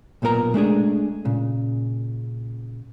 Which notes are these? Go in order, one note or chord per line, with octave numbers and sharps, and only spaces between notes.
B1 A#2 B3 A#4 A#5
G#3 A3 D4 G#4
A#2 C#3